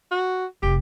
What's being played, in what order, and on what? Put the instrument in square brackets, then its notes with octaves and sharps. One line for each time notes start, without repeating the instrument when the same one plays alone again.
[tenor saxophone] F#4
[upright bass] F1 C3 [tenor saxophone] G4